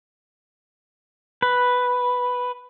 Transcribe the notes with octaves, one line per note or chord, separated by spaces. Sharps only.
B4